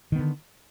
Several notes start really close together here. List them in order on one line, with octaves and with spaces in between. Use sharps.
D#3 B3 D3